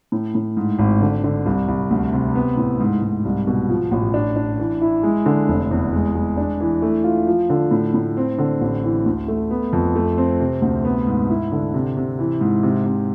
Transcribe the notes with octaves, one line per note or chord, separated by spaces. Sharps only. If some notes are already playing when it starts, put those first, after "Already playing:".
A2
A2
G#2
G#1
D3
D3
C2
C2
D2
C3
B3
A2
G#2
G#2
C2
B2
F3
A1
D4
D4
E3
E4
G#3
D3
F1
E2
G#3
G#3
D4
E3
A3
F4
F3
D3
A2
A2
C4
D3
A1
E3
D2
A3
B3
F2
A3
C4
C3
D2
B3
G#2
E4
D3
C3
C3
E3
G#2
C3
C3